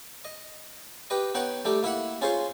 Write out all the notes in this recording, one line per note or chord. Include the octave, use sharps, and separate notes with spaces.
D#5
G4 B4 D#5
B3 D#4 C#5 F#5 G5
G3 A3 D#4 G4
A#3 E4 E5 F#5
C#4 D#4 F4 G#4 C5 C#5